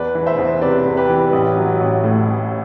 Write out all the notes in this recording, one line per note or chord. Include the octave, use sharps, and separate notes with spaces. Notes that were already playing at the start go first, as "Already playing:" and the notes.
Already playing: E2 B4 D5
E3
C5 E5
E2
C3 B4 D5
E2
G4 B4
E3
A1
F#3
A1
A2
A1